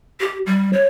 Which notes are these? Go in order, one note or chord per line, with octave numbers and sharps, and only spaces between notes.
G4
G3
C#5